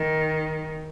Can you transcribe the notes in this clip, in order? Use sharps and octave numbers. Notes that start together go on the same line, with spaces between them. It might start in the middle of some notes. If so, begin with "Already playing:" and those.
Already playing: D#3